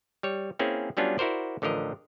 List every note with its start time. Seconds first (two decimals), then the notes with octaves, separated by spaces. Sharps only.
0.23 G3 C#5
0.59 A#3 C4 C#4 E4 G#4
0.97 F#3 G3 B3 C#4 D4 F4
1.18 E4 F#4 A#4 C5 D5
1.62 A1 D3 F3 A#4 D#5